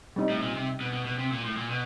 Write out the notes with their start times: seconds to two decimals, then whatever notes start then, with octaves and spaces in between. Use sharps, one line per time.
0.16 G3 C4 D#4
0.30 A2
0.42 A#2
0.55 C3
0.81 B2
0.93 B2
1.05 B2
1.18 C3
1.32 A#2
1.45 A2
1.57 A#2
1.70 B2